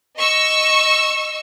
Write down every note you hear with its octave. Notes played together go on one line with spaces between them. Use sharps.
D#5 C#6 E6